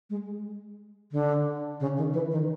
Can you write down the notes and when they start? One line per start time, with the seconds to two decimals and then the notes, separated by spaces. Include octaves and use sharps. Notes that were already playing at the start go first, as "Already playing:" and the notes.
0.10 G#3
1.12 D3
1.80 C#3
1.97 D#3
2.13 E3
2.31 D#3